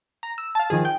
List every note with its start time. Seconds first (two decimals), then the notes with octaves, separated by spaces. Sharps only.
0.23 A#5
0.38 E6
0.55 F5 A5
0.70 D#3 F3 G#4
0.85 G5